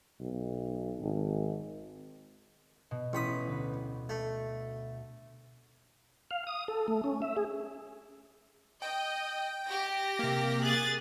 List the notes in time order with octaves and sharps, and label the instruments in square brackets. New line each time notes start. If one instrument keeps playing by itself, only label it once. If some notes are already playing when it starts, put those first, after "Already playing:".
[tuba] B1
G#1
[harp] B2
[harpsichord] A1 B5 D#6 [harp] C#6
[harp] D2 B4
[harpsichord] A3
[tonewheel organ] F5
D#6
A4
A3
C#4
E5
G#4
[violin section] D#5 [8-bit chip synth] G5
[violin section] G4 A#6
[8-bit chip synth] C3 A#3
[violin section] G#4 F#6 A6